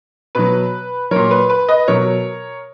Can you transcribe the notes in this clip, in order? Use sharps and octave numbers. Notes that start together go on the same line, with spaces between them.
B2 F#3 B4
A#2 F#3 A#4 C#5
B4
B4
B4 D#5
B2 F#3 A#4 C#5